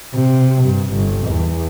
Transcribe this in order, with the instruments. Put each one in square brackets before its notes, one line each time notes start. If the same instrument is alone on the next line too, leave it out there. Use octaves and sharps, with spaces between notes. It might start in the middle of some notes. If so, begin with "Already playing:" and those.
[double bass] C3
G2
G1
E2